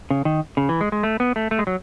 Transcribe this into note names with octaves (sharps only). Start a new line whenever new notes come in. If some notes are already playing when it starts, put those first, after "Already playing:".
C#3
D#3
C#3
E3
G#3
G#3
A3
B3
A3
A3
G#3
F#3